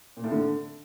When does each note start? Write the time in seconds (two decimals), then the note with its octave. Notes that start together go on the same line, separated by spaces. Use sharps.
0.17 A#2
0.24 A2
0.31 D3